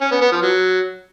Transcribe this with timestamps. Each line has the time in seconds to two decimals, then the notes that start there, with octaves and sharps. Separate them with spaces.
0.01 C#4
0.11 B3
0.22 B3
0.32 F3
0.42 F#3